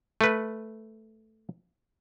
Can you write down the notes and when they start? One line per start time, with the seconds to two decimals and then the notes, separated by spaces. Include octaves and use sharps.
0.21 A3 B4